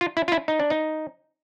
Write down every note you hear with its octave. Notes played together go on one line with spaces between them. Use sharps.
F4
E4
F4
E4
D#4
D4
D#4